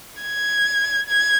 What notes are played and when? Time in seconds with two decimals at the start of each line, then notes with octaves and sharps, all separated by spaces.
0.22 G#6
1.09 G#6